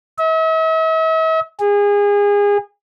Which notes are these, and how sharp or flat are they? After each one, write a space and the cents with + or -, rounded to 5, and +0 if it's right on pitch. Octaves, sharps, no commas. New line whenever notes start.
E5 -45
G#4 -30